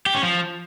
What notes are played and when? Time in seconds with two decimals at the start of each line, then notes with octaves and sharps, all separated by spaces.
0.06 G4
0.15 C#4
0.23 F3